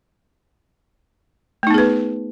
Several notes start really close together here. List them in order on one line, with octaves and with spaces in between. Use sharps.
A3 D#4 B3 G#4 B4